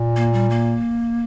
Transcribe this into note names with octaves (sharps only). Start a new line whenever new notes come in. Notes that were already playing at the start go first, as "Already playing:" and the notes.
Already playing: A#2
A#3
G3
A#3